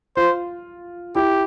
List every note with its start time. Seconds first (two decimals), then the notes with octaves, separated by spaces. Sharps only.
0.17 F4 C5
1.15 E4 G4